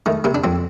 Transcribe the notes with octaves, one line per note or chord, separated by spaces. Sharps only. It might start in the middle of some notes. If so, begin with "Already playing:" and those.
D#3 A3
C3 A#3
D4
F2 C4